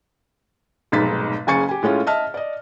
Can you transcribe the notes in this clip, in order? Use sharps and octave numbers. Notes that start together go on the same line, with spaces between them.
F1 B1 G#2 A6 B6
F#1 C#3 G#5 C#6 A6 C#7
G4 G#5
A2 G#3 C#4 F4
D#5 E5 A5 F6
D5 D#5